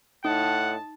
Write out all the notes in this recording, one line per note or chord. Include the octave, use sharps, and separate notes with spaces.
A2 D#4 F#5 A5